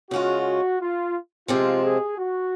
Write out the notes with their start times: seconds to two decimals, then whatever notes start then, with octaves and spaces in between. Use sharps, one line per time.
0.11 C#3 G#3 C#4 F4 F#4
0.80 F4
1.48 C3 F3 G#3 C4 F4
1.83 G#4
2.18 F#4